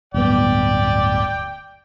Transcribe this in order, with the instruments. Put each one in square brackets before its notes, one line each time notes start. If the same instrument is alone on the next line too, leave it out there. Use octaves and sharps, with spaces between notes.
[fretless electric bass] D1 G1 B3 [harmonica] D5 G5